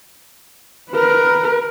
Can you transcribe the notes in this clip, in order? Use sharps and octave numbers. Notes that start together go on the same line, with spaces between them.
A#4 B4